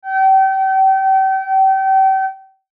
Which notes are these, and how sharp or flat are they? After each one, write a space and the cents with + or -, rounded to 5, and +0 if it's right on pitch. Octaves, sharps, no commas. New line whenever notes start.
G5 -35